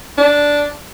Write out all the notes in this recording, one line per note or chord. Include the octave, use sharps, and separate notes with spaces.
D4